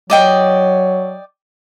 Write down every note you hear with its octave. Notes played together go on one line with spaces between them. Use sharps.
F#3 D5 D#5 G5